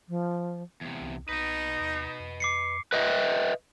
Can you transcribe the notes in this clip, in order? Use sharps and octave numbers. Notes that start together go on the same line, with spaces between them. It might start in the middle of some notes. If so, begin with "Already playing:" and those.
F3
E2 C3
C2
B1 D#4 B4 D#5
D#2
F2
D6 C7 C#7
B4 D#5 E5